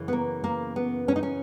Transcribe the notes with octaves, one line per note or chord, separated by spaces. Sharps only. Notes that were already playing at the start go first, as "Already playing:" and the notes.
Already playing: F#2 C#3 E3
B3
A#3
A#3
B3
C#4
D#4
C#4